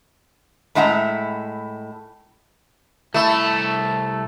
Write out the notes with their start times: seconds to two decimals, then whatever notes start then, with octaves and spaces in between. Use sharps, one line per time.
0.75 A2 G#3 E4 F#5 A#5
3.14 C2 A3 E4 A5 E6